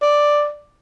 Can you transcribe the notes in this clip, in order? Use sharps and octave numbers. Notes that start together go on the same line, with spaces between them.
D5